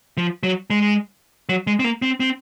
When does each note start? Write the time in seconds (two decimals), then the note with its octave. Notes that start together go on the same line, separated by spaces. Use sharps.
0.17 F3
0.43 F#3
0.70 G#3
1.49 F#3
1.67 G#3
1.79 C4
1.84 A#3
2.02 C4
2.20 C4